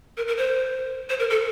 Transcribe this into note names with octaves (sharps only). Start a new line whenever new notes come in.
A#4
A#4
C5
C5
A#4
A4